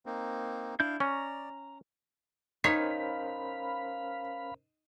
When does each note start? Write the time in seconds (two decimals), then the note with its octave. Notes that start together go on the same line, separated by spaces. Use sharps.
0.06 A#3 C4 D#4
0.80 D4 E4 F5 G6
1.00 C#4 D5 A#5 C#6
2.64 C#4 D#4 A#4 C5 C#5 F5 B5 B6